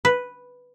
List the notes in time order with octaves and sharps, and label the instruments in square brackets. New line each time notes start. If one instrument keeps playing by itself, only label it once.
[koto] B4